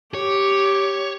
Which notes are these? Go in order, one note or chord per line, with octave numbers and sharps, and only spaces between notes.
G4 C#5